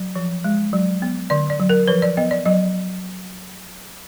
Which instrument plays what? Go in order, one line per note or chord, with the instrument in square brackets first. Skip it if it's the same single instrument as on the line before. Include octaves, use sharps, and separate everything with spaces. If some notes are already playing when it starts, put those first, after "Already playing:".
Already playing: [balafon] F#3
F3
G#3
F#3
B3
D3 D5
D5
F#3
A#4
F3 B4
D5
B3 D#5
D5
F#3 D#5